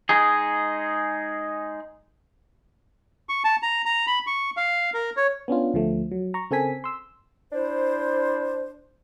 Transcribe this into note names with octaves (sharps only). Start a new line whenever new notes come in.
G#3 D#4 G#4
C#6
A5
A#5
A#5
B5
C#6
F5
A#4
C#5
B3 C#4 D4 F4
D2 F3 A3
F#3
A#5 C#6
C#3 C4 A4 A#4 G#5 B6
C6 E6
D4 E4 C5